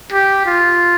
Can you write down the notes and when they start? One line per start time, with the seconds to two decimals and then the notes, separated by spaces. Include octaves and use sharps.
0.12 G4
0.45 F4